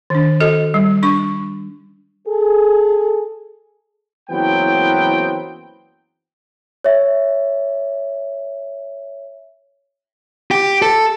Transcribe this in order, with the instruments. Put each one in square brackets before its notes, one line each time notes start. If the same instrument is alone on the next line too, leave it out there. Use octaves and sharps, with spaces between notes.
[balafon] D#3 D4
F#4 A4 D#5
G3
D4 C#6
[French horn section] G#4 A4
[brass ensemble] F#1 E3 F#3 B3 C4 G5
[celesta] C#5 E5
[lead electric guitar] G4
A4